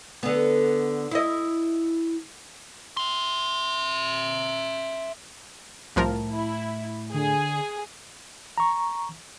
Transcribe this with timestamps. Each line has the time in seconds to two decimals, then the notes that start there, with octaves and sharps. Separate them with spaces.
0.23 D3 B3
1.11 E4 D#5
2.97 E5 C6
5.96 C2 A2 F3 A#4 A5
6.31 E4
7.14 D3 G#4
8.58 A#5 C#6